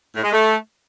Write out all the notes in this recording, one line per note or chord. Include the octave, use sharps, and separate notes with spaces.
A2
G#3
A3